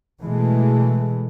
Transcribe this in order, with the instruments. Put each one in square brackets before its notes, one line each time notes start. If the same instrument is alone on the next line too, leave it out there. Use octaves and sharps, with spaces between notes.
[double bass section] B2 E3 G#3 A3